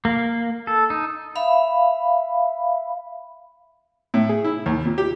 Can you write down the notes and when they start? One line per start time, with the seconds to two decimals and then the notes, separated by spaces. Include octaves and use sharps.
0.05 A#3
0.67 A4
0.90 D#4
1.36 E5 F5 B5
4.14 A2
4.29 G#4
4.44 E4
4.66 D#2
4.85 A#2
4.98 G4